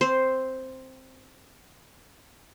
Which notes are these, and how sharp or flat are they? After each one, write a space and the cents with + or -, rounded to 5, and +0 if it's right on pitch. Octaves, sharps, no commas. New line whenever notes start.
C4 +0 C5 +0